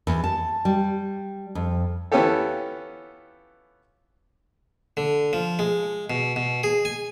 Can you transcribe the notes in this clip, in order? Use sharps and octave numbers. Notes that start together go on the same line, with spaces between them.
E2
A5
G3
F2
E3 B3 C#4 F4 G4 A4
D3
F3
G#3
B2
B2
G#4
G#5